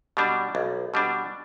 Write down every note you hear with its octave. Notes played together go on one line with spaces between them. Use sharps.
B2 G3 D4
B1
B2 G3 D4